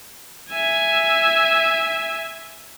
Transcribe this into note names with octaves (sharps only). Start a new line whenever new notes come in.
E5 G#5